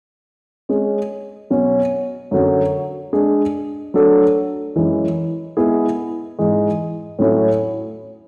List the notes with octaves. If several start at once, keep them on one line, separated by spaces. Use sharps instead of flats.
G#3 C#4 G#4
B2 F#3 C#4
F#2 D3 F#3
G#3 D4 G#4
F#3 A3 D4 A4
F#2 E3 G#3
G#3 B3 E4 G#4
G#2 E3 G#3
A2 F#3 A3 C#4 E4